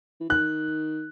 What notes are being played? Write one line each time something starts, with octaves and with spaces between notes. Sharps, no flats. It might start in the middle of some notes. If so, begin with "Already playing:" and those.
E3
D#3 F#6